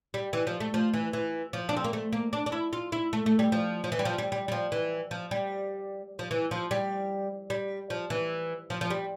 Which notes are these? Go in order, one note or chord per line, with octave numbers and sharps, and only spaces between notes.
G3
E3
F3
A3
F3
E3
E3
F3
D4
C4
A#3
A3
A#3
D4
D4
E4
F4
E4
A3
A3
G3
F3
F3
E3
G3
F3
G3
G3
G3
F3
E3
F3
G3
F3
E3
F3
G3
G3
F3
E3
F3
F3
G3